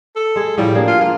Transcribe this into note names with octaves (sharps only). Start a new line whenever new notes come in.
A4
G#3 G#4
A2 F3 G3
A#3 D4 G#4
F4
A#3 F4